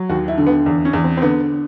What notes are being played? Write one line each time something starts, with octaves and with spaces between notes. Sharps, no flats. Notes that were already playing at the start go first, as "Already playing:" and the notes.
Already playing: F#3
D#2 F#4
E4
D3
B3
E2
C#4
E2
C4
C4
D3 B3